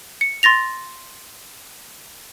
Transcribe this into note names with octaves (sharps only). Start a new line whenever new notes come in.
C#7
C6 A6 A#6 F7